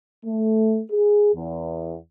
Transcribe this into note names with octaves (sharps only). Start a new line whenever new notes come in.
A3
G#4
E2